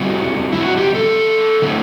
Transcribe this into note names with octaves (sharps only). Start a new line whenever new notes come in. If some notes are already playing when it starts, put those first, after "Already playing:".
Already playing: D3 G3 C4 E4 F#4
E4
F#4
G4
A4
D3 A3 C4 E4